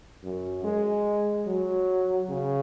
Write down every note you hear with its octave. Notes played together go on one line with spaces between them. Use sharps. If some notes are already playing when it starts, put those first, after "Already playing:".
F#2
G#3
F#3
C#3